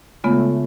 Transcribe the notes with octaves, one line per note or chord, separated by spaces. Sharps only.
C#3 G#3 A3 B3 F4